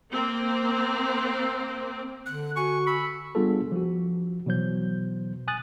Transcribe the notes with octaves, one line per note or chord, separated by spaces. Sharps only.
A#3 C4
D3 F#6
F#4 G#5 C#6
B5 E6
G3 B3 D4 F4 G#4 A4
F3 F#4
B2 E3 F#3 C5 G6
G#5 D#6 F#6 A6